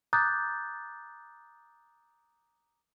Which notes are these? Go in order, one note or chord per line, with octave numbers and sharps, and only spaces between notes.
A#5 D6 D#6 F#6 G6 A6